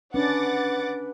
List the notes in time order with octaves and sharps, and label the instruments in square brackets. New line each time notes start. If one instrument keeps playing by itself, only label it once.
[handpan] C#4 D4 [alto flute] B4 [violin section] F#5 D6 A6